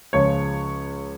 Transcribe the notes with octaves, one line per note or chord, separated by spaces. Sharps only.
C#2 C#3 F3 C#5